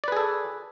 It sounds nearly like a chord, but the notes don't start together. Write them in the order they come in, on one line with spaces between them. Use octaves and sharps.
D5 B4 G#4 A4